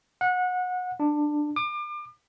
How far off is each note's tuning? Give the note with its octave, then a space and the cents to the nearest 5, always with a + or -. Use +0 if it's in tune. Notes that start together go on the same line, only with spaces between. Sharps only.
F#5 -25
D4 +15
D6 +35